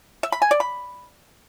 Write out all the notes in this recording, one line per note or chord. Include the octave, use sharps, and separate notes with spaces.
E5
B5
G#5
D5
B5